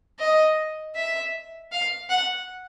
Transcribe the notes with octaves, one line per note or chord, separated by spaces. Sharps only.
D#5
E5
F5
F#5